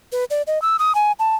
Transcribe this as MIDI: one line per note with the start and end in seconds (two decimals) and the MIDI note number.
0.12 0.24 71
0.30 0.42 74
0.47 0.61 75
0.62 0.76 88
0.79 0.94 87
0.95 1.12 80
1.19 1.36 81